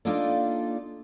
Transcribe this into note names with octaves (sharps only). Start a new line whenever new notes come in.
A#3 D4 D#4 F4 A4 D5